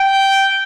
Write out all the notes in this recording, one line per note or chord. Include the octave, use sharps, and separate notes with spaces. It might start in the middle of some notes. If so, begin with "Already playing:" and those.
Already playing: G5